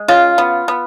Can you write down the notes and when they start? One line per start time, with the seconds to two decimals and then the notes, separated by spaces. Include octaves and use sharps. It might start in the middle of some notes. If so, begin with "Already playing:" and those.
Already playing: G#3
0.08 C#3 F4
0.38 B3
0.68 B3